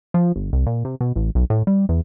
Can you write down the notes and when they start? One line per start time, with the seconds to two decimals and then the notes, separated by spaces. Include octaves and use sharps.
0.14 F3
0.36 G1
0.53 C2
0.66 A#2
0.85 C3
1.01 B2
1.16 A1
1.35 B1
1.50 A2
1.67 G3
1.89 E2